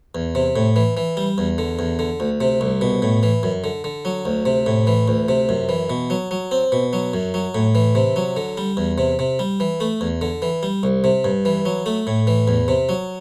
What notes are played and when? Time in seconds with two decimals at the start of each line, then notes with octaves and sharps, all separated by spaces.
0.15 E2
0.35 C3
0.56 A2
0.76 E3
0.97 E3
1.17 G3
1.38 E2
1.58 D3
1.79 E2
1.99 D3
2.20 D2
2.41 C3
2.61 C2
2.81 B2
3.02 A2
3.23 E3
3.43 F#2
3.64 D3
3.84 D3
4.05 F#3
4.25 D2
4.45 C3
4.66 A2
4.87 E3
5.08 D2
5.29 C3
5.49 F#2
5.69 E3
5.90 B2
6.10 F#3
6.31 F#3
6.51 C4
6.72 B2
6.93 F#3
7.14 F#2
7.34 F#3
7.55 A2
7.75 E3
7.95 C3
8.16 F#3
8.37 D3
8.57 G3
8.77 E2
8.98 C3
9.19 C3
9.39 G3
9.60 E3
9.80 A3
10.01 E2
10.21 D3
10.42 E3
10.63 G3
10.83 C2
11.04 C3
11.25 G2
11.45 E3
11.65 F#3
11.86 A3
12.07 A2
12.27 E3
12.48 E2
12.68 C3
12.89 F#3